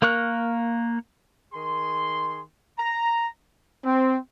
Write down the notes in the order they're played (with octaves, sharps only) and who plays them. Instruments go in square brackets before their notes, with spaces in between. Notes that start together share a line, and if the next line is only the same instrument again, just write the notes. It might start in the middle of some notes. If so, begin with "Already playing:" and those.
[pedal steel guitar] A#3 A#4 C#6 F#6
[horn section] D#3 G#4 C6
A#5
[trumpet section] C4